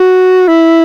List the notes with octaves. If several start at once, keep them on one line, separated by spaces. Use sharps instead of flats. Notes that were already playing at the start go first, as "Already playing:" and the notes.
Already playing: F#4
E4